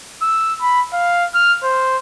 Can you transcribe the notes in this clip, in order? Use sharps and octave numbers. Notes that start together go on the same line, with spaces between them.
E6
B5
F5
F6
C5